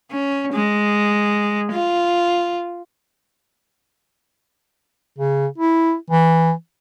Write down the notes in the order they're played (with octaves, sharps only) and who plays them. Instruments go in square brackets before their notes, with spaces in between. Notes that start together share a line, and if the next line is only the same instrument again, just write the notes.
[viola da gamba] C#4
G#3
F4
[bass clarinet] C#3
E4
E3